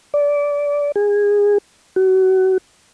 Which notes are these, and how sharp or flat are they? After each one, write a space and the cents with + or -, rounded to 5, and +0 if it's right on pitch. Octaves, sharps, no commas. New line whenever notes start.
D5 -20
G#4 -20
F#4 +30